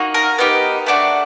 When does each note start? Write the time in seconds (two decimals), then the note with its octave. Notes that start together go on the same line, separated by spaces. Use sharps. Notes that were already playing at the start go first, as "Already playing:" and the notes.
Already playing: A#3 D#4 F#4
0.14 A#4
0.38 B3 D#4 G4
0.86 A3 D4 F#4